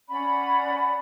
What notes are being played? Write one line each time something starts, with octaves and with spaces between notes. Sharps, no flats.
C#4 D5 F#5 B5